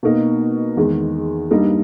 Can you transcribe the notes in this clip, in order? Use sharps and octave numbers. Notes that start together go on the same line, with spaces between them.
B2 A#3 D#4
E2 D#3 G#3
G2 G3 A#3 D#4